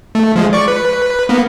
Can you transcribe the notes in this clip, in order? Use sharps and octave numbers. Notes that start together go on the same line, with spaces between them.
A3
F3 G#3
D5 C#6
B4
A#3 B3